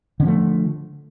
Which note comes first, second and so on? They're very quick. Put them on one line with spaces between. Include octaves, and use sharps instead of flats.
D3 C#4 F3 A3